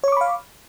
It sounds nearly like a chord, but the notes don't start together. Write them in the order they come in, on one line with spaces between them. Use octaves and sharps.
C#5 C#6 D6 B5 F5